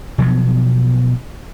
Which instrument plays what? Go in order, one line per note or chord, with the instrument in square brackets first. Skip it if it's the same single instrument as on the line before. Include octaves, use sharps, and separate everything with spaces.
[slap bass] B2 F3 F#3 B3